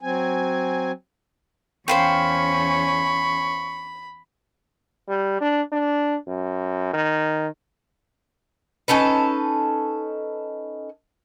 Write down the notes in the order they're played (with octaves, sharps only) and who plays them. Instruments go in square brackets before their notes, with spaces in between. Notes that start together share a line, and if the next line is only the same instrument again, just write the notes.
[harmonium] F#3 C4 G#5
[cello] E2 C#4 [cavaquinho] C5 F5 G5 [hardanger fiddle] B5 [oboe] C#6
[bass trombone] G3
D4
D4
F#2
D#3
[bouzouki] C#4 D#4 A4 B4